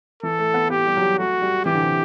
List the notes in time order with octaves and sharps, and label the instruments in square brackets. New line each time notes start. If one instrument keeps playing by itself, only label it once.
[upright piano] E3 [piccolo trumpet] A4
[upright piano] A3
B3
[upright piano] B3 [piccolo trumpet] G4
[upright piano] G3
F#3
G3
[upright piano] A3 [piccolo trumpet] F#4
[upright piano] G3
[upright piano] E3 [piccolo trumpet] G4
[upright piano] D3
C3